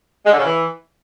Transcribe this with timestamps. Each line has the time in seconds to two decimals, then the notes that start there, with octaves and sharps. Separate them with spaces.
0.25 G#3
0.31 D3
0.38 C#3
0.44 E3